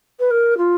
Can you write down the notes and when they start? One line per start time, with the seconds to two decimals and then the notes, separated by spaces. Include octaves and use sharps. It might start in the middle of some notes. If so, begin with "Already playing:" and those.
0.20 B4
0.31 A#4
0.58 F4